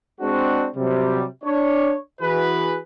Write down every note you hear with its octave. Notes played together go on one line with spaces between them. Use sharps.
G#3 C4 D4 F#4
C3 F#3 G3
D4 C#5
E3 F#4 G#4 B4